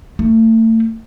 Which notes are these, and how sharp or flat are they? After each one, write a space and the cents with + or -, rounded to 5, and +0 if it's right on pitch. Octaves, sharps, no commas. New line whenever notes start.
A3 +35